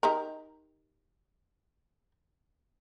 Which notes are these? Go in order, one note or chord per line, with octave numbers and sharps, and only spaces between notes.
D#4 G4 A#4